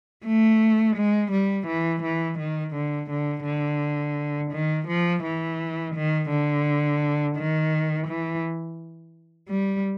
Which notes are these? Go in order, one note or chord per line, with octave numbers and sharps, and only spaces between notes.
A3
G#3
G3
E3
E3
D#3
D3
D3
D3
D#3
F3
E3
D#3
D3
D#3
E3
G3